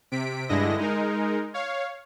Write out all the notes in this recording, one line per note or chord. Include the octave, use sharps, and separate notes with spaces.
C3 B6 D7
G2 D3 G#3 E4 D#5 A#6
G#3 D#4 A#4
C#5 F5